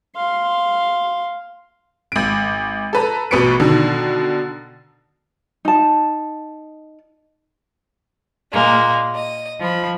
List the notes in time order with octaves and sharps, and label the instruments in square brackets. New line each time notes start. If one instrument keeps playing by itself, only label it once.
[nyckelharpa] F5 C6
[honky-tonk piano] G#1 D7
A4 B4 A#5
A1 B2 B4 C#6 C#7 D7
B2 D3 D#3
[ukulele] D#4 A5
[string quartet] A#2 G#3 A#3
D#5
F3 B5